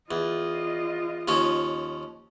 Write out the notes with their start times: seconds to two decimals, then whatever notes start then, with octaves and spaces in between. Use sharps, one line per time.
0.11 E2 F4 D#5
1.28 D#2 F3 C#4